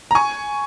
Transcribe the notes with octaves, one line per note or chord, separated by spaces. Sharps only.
A#5
G#5 C#6